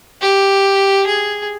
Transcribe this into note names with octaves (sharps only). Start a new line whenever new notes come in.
G4
G#4